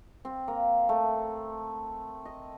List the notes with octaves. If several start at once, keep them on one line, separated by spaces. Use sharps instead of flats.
C4
A#3
A3
D#5